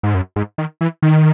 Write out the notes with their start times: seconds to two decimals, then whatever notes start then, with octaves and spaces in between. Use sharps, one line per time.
0.03 G#2
0.14 F#2
0.36 G#2
0.58 D#3
0.81 E3
1.02 D#3